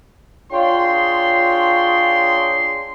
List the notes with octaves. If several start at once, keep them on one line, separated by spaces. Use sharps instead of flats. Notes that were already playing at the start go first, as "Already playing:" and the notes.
D4 F4 G#4 C#5 G5 C6